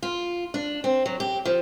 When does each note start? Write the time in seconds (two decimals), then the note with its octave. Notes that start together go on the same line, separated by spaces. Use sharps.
0.03 F4
0.54 D4
0.84 C4
1.06 F#3
1.20 G4
1.45 F3